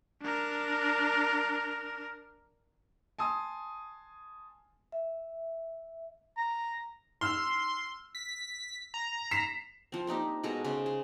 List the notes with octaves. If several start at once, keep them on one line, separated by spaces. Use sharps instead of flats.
D4 A#4
G#5 A5 C6 D#6
E5
A#5
C6 E6 F6
B6
A#5
B6 C7 E7
F3 C4
A#3 D4 D#4 G4
B2 G#3 A4 A#5
C#3 G#3 C5
G#4